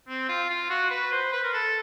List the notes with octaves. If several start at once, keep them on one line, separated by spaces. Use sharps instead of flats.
C4
F4
F4
F#4
B4
C5
B4
A#4
A4